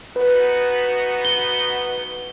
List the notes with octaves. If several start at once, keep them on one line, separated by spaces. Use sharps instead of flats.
B3 D#4 F#4 B4
G7